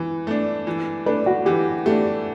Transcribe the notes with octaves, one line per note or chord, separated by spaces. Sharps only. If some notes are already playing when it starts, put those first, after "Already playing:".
Already playing: E3
A3 D4
E3
A3 D4 B4
F#4
E3 G4
A3 D4 G4